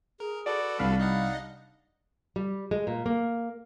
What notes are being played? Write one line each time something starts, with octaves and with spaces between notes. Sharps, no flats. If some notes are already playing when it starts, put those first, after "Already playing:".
G#4 A#4
F#4 A4 B4 D5
C2 G3 D4 F5 B5
D#4 D#5 F#5
G3
G#3
A#2
A#3